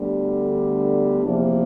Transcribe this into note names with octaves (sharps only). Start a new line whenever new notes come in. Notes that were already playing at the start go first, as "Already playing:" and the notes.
Already playing: D2 D3 G3 B3
E2 C3 F3 A#3 D4